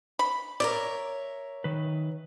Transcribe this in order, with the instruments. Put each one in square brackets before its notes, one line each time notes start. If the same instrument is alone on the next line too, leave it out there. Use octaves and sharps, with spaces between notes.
[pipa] B5
[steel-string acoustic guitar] A#4 C#5 E5 [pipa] D5
[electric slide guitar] D#3 B4